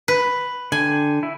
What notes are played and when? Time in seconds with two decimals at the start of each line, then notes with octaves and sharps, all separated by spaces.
0.08 B4
0.72 D3 G5 G#5
1.23 E4